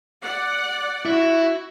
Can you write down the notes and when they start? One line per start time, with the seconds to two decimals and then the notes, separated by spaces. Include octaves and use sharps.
0.23 D5 F#5
1.05 E4 F#4